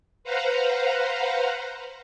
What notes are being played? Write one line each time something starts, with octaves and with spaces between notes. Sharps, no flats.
B4 C5 F5 F#5 A#5